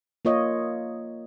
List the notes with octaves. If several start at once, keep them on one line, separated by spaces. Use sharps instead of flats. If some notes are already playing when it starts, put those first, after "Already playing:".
A#3 F4 C#5 D#5